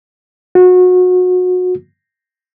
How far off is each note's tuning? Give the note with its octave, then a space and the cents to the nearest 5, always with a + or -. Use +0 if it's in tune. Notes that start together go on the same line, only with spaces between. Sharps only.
F#4 -25